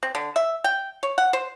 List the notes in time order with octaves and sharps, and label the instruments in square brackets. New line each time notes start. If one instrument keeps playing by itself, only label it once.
[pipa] C4
D3
E5
G5
C#5
F#5
C5